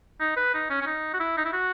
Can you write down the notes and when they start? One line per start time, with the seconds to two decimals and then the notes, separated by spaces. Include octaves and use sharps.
0.20 D#4
0.36 B4
0.54 D#4
0.70 C#4
0.81 C#4
0.86 D#4
1.14 F#4
1.20 E4
1.37 D#4
1.45 E4
1.53 F#4